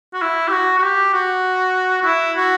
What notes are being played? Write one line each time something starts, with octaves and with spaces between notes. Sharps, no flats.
F#4
E4
G4
F#4
F#4
G4
F#4
F#4
E4
F#4